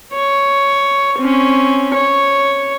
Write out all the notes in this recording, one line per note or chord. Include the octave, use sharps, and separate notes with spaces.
C#5
C4 C#4
C#5